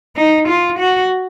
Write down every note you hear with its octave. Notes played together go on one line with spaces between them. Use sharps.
D#4
F4
F#4